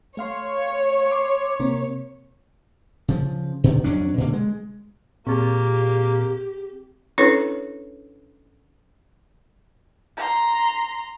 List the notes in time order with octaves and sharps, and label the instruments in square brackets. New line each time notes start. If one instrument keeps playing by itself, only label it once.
[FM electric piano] A3 F5 C6 [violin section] C#5
[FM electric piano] C6 D6
C3 A#3 C4
[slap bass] C#3 F3
B2 D3 D#3
F2 F#3 C#4 D4
B2 D3 A#3
G#3
[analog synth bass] A#2 [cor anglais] A#3 [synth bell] C4 G#4 [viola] G4
[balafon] C#4 D4 E4 A4 B4 C#5
[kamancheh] A#5 C6